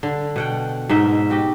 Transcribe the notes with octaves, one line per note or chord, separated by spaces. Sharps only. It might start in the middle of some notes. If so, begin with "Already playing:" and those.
D3
B2 F#5 G5
G#2 B2 D#4 E5
F#4 G4 D#5